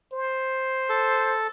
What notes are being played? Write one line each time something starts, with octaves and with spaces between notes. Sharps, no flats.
C5
A4